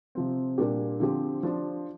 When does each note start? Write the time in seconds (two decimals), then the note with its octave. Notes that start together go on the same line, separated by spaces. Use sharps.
0.15 C3 F3 C4
0.58 A#2 G3 A#3 D4 G4
1.00 D3 F3 C4 G4
1.43 F3 D4 F4